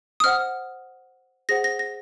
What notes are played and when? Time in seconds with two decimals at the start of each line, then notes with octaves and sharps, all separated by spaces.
0.20 D#6
0.24 C5 D#5 F#5 F6
1.49 G#4 C5 F#5 A#6
1.64 A#6
1.79 A#6